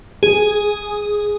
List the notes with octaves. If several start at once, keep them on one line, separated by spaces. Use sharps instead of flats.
G#4